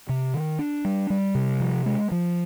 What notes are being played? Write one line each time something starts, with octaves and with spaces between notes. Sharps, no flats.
C3
D#3
D4
G3
G3
C3
F3
G#3
F3